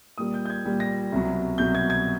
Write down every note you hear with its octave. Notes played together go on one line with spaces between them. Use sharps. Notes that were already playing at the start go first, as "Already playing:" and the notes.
A#2 G3 A#3 D#6
G6
G6
G#6
A#2 G3 A#3
A#6
C2 B2 F#3
C2 B2 F#3 G6
G#6
G#6